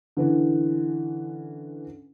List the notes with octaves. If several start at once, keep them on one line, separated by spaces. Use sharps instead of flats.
D3 E3 C#4